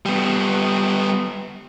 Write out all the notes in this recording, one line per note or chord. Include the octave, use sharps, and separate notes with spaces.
G3 B3